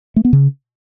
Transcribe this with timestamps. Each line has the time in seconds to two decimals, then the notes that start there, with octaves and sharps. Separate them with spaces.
0.16 A3
0.25 B3
0.33 C#3